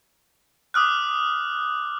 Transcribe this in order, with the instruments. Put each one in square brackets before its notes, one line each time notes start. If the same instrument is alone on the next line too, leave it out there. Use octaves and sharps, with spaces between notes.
[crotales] D6 D#6 F6 F#6